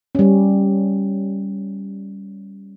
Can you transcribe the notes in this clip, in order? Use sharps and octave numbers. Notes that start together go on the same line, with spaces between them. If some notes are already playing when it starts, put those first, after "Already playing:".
G3 C#4